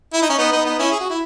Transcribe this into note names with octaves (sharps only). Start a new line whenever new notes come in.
E4
D#4
C#4
B3 D#4
B3 D#4
B3 D#4
C#4 E4
G#4
F#4
E4